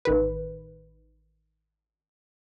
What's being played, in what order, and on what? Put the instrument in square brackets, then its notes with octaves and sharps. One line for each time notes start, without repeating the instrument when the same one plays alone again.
[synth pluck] A1 D#3 B4